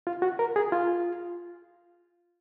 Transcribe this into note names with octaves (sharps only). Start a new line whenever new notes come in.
F4
F#4
A#4
G#4
F4